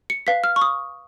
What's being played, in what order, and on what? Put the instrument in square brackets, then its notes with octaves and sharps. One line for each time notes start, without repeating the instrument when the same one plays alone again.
[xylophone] C#7
B4 F5 B6
F6
C#6
D#6